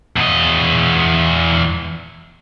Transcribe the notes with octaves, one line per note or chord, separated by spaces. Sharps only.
E2 D#5